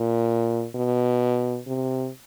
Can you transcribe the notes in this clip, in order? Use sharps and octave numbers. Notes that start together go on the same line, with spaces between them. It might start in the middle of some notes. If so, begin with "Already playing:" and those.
Already playing: A#2
B2
C3